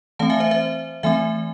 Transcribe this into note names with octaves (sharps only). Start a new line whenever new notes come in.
E3 A3 C4 F5 A5
E5 G#5
C5 E5
C5 E5
E3 A3 C4 E5 G#5